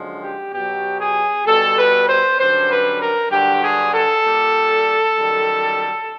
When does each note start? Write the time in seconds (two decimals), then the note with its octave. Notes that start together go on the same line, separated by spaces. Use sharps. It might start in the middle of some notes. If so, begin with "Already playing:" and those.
Already playing: F#2 D3 F3 G#3
0.22 G4
0.53 B2 F#3 G4
1.00 G#4
1.46 B2 G3 A4
1.77 B4
2.07 C5
2.38 F#2 D3 G3 C5
2.70 B4
3.00 A#4
3.31 G2 D3 F#3 G4
3.62 G#4
3.93 A4
4.24 A#2 G3
5.17 F#2 D#3 G3